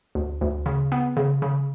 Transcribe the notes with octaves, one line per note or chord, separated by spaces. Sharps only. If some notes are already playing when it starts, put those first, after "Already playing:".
D2
D2
C#3
B3
C#3
C#3